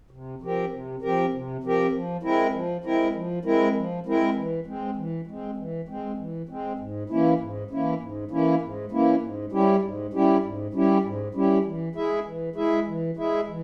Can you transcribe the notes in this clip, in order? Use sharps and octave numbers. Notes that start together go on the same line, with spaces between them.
C3
F3 C4 G4 A#4
C3
F3 C4 G4 A#4
C3
F3 C4 G4 A#4
F3
G#3 C4 E4 A#4
F3
G#3 C4 E4 A#4
F3
G#3 C4 E4 A#4
F3
G#3 C4 E4 A#4
E3
G#3 C4
E3
G#3 C4
E3
G#3 C4
E3
G#3 C4
G#2
E3 A#3 C#4 E4
G#2
E3 A#3 C#4 E4
G#2
E3 A#3 C#4 E4
G#2
E3 A#3 C#4 E4
G#2
G3 C#4 E4 G4
G#2
G3 C#4 E4 G4
G#2
G3 C#4 E4 G4
G#2
G3 C#4 E4 G4
E3
G#3 E4 G#4 E5
E3
G#3 E4 G#4 E5
E3
G#3 E4 G#4 E5
E3